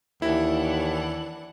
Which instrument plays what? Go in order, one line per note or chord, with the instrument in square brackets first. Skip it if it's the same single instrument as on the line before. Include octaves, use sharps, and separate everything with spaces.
[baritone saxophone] D#2 [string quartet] E3 D4 F#5 [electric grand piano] E4